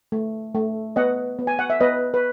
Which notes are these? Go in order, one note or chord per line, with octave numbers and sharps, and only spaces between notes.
A3
A3
B3 D#5 F#5
B3
G#5
F#5
E5
B3 B4 D#5
B4